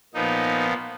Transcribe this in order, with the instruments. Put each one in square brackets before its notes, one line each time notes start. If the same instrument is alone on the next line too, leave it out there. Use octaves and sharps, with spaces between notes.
[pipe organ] A#2 F3 B3 D#4